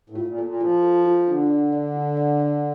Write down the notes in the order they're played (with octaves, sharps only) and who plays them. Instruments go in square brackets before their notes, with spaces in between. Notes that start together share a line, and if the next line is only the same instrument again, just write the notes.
[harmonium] A2
[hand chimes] F4
[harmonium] A2
A#2
[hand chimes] A4
[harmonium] A#2
[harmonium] F3 [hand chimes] F4
[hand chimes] A4
F4
[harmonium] D3 [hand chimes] D4
[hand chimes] D5
D5
D4
D5
D5